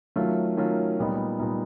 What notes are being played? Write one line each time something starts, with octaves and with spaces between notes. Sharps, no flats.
D#3 F#3 A3 C#4 F4
D#3 F#3 A3 C#4 F4
A#2 G3 B3 D#4
A#2 G3 B3 D#4